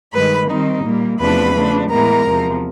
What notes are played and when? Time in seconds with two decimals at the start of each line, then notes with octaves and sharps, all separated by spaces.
0.13 G2 D#3 G#3 B4 B5
0.49 D#3 G3 C4 D#4
0.84 A#2 G3 A#3
1.19 E2 C3 F3 A3 D4 B4 B5
1.54 C#3 F3 A3 D4
1.90 A2 E3 G#3 B3 A#4 A#5
2.25 E2 C3 F3